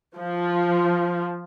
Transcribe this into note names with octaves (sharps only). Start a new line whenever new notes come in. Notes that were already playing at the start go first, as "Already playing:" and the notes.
F3